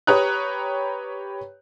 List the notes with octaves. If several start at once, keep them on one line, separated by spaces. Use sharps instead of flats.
G4 B4 C#5 A#5 D#6 F#6